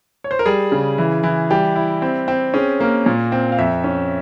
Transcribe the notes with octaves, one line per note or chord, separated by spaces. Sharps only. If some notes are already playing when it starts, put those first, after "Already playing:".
C#5
C5
A#4
G3 G#4
C#3
E3
E3
G3 G4
E4
C4
C4
C#4 G#4
A#3 A#4
A#2
C4
F5
F2 E5
C#4